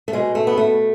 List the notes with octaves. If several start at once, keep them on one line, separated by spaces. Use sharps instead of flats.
A3
B2 G#3
A3
B3
A3